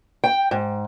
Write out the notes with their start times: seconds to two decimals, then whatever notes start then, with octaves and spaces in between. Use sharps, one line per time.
0.24 G5
0.51 G#2